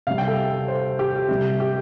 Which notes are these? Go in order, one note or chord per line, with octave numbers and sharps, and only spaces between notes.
C3 G3 F5
G5
A4
C5
G4
C3 G3
G4